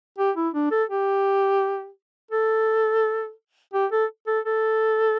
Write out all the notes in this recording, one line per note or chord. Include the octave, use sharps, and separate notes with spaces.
G4
E4
D4
A4
G4
A4
G4
A4
A4
A4